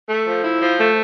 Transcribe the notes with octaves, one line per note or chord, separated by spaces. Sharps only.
A3
F3
E4
F3
A3